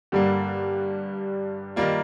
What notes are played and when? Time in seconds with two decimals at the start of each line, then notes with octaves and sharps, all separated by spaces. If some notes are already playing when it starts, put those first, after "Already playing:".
0.12 G2 D3 G3 A#3
1.76 D#3 G3 A#3 F4